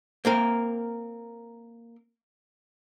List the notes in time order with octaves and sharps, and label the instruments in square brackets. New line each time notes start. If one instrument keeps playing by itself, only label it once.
[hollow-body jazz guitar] A#3 C4 A#4